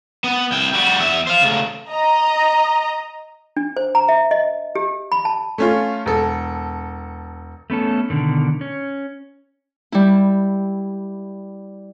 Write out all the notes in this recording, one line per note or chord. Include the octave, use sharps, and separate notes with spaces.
B3
C2 G5
G3 F#4
E2 E5
C5 F5
C#3 A3
D#5 A#5
D4
C5
A#5
E5
D#5
G4
B5
A5
A3 C#4 F4
E1 A4
A3 B3 C#4 A4
B2 D3 D#3
C#4
G3 E4